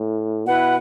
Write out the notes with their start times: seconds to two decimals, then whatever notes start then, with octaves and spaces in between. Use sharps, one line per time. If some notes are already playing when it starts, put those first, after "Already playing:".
Already playing: A2
0.45 B2 E4 B4 F#5